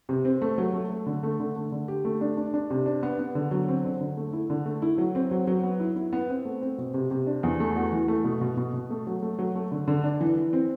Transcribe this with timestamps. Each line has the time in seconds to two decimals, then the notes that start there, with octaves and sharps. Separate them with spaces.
0.09 C3
0.25 C4
0.42 A3
0.58 F#3
0.74 A3
0.90 A3
1.07 D3
1.23 A3
1.40 D3
1.56 A3
1.72 D3
1.88 G4
2.05 A3
2.21 D4
2.37 D4
2.54 D4
2.70 C3
2.86 D4
3.03 B3
3.19 B3
3.35 D3
3.51 F#3
3.68 C4
3.85 D3
4.01 D3
4.17 A3
4.33 E4
4.50 D3
4.66 A3
4.82 E4
4.98 F#3
5.15 C4
5.31 F#3
5.47 F#3
5.63 B3
5.80 E4
5.96 E4
6.13 B3
6.29 C4
6.45 A3
6.62 C4
6.78 B2
6.94 C3
7.11 C3
7.27 D4
7.43 E2
7.60 A3
7.76 F#4
7.92 E3
8.08 A3
8.24 B2
8.41 B2
8.57 B2
8.74 B2
8.90 A3
9.07 F#3
9.23 A3
9.39 F#3
9.55 A3
9.72 D3
9.88 D3
10.04 D4
10.21 E3
10.37 E3
10.53 C4